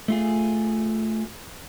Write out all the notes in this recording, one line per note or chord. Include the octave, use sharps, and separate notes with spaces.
A3 F4 G#4